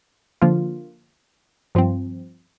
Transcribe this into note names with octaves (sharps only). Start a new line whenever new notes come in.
D3 F3 A#3 F4
G2 F3 C4